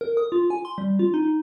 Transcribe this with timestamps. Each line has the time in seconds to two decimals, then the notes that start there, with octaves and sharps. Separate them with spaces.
0.01 A#4
0.17 D#6
0.32 F4
0.50 G#5
0.65 C6
0.78 G3
0.99 F4
1.14 D#4